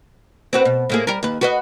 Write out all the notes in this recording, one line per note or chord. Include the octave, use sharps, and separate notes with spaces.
C4 F#4 B4
B2
A2 A#3 G#4
G3 A#4
D#2 B4
F#4 B4 D#5